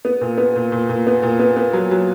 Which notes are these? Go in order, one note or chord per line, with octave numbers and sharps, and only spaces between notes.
B3
A#2
B3
A#2
A#2
A#2
B3
A#2
B3
B3
F#3
F#3